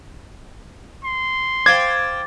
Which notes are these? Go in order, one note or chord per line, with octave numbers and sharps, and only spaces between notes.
C6
C5 F5 G5 D6 G#6 A6